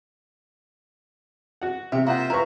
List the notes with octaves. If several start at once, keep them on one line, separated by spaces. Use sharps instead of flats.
F#4 F#5
C3 C4 G4 E5
A#3 F4 C5 D#5 E5 F#5
E4 A#4 B4 A#5 C#6